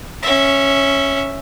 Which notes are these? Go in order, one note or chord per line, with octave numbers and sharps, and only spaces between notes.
C#4 E5